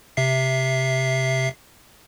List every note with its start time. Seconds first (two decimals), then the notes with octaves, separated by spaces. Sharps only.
0.17 C3 E5 C7